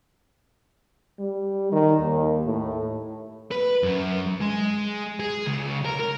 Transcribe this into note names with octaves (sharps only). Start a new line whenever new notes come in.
G3
D#3
D#2
A2
B4
F#2
G#3
G#4
C#2
A#4
A#4